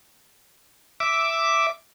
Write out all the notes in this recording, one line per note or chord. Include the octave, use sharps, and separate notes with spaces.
E5 D6